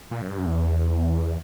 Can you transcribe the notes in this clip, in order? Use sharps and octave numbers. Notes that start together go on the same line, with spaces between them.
A#2
F#2
G2
F#2
E2